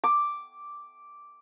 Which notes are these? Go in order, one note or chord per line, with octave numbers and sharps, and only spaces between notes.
D6